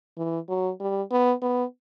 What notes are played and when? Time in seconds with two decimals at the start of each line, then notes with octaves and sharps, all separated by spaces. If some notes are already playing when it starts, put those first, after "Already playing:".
0.17 E3
0.49 F#3
0.80 G3
1.12 B3
1.42 B3